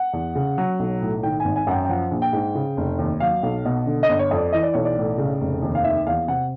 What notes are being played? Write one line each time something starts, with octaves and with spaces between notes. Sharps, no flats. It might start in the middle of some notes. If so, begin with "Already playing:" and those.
Already playing: F#5
E2
C#3
F#3
B1
A2
D#3 G5
G#5
G#1
G#5
F#2 F#5
G5
G5
F3 F#5
A#1
G5
G#2
C#3
F1
D#2
F#3 F5
B1
B2
D3
D#5
G1
C#5
F2
D5
E3 D#5
D5
B1 C#5
D5
A2
C#3
F1
D#2
F5
D#3 E5
E2 F5
C3 F#5